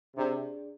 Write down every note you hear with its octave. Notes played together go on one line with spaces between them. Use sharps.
C3 D4 G#4 D5